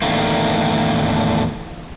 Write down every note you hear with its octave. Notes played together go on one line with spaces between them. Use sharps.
E2 A2 D3 D#3 A3 A#3